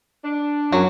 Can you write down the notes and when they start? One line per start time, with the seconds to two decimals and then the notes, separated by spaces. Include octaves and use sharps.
0.23 D4
0.72 F#2 F#3